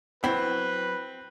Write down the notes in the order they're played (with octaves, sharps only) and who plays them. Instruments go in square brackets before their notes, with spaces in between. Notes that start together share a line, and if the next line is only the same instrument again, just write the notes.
[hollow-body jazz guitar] F#3 E4 B5 [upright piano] C4 [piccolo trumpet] B4